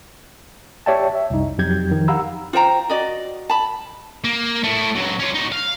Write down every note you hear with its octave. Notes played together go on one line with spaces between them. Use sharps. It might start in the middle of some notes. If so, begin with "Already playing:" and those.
G4 C#5 D5 E5 G5 A5
E5
C2 F#2 D#4
F2 F#3 G4 G6 G#6
D#3 F3
G4 F5 F#5 A#5 B5 E6
F4 C5 G5 A#5
F#4 D5 D#5
A5 B5
A#3
A3 E4
C#2 F#3
C#4 F4
D#4 F#4
F5